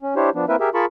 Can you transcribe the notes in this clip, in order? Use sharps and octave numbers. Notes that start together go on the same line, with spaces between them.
C#4
D4 E4 G4 C5 C#5
F3 B3 D4
A#3 C4 E4 A#4 B4 E5
G4 G#4 A#4 E5
F4 G#4 A#4 A5 B5 C#6